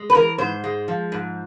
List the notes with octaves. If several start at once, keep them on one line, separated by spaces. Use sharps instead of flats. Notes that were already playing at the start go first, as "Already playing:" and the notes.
Already playing: G#3
B4
E3 A#4
G#2 C5
G#3
F3
G#2